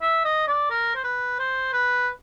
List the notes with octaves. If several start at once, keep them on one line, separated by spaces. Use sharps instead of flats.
E5
D#5
D5
A#4
C5
B4
C5
B4